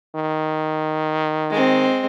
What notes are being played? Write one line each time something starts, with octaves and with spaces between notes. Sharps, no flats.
D#3
G#3 C4